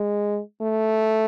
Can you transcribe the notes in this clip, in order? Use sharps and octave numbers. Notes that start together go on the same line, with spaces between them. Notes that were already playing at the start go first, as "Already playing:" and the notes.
Already playing: G#3
A3